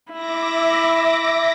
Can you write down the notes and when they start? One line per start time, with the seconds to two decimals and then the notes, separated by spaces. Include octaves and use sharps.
0.13 E4 E5 D6 A#6